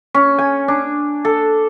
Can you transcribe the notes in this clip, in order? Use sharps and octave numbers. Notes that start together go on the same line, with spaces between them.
C#4
G#5
D4
A4